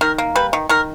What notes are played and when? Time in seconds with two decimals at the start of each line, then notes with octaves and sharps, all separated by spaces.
0.01 D#3 A#4
0.18 A#3
0.36 G3 B4
0.53 D#3
0.69 D#3 A#4